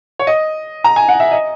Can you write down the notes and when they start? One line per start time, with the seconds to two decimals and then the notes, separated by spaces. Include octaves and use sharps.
0.19 C#5
0.27 D#5
0.84 A#5
0.96 G#5
1.09 F#5
1.20 E5
1.32 D#5